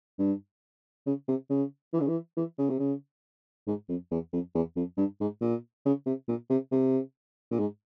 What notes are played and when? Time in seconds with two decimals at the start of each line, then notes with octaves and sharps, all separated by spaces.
0.19 G2
1.06 C#3
1.28 C3
1.50 C#3
1.94 E3
2.01 C#3
2.08 E3
2.37 E3
2.59 C#3
2.70 C3
2.79 C#3
3.67 G#2
3.89 F2
4.11 E2
4.33 F2
4.55 E2
4.76 F2
4.98 G2
5.20 G#2
5.41 A#2
5.86 C#3
6.06 C3
6.28 A#2
6.50 C3
6.72 C3
7.51 A#2
7.59 G#2